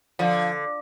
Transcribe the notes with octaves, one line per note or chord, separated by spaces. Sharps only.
D3 F3